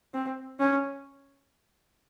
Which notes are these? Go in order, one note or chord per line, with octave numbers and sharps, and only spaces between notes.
C4
C#4